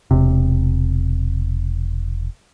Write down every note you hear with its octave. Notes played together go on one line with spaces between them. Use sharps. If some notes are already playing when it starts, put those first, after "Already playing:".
E1 C3